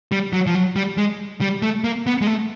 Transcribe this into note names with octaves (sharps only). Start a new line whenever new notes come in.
G3
F#3
F3
F#3
G3
G#3
G3
A3
A#3
B3
G#3
A3